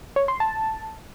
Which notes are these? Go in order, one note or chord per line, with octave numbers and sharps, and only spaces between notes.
C#5
C6
A5